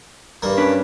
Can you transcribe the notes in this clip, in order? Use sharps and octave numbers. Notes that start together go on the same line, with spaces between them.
G2 A#3
C#4 D4 B4